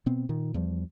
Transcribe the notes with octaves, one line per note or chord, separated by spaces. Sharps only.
B2 B3 C4
A#2 D#3
E2 F3 G3